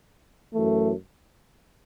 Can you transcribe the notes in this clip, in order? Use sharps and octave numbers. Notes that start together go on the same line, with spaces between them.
F#2 E3 A3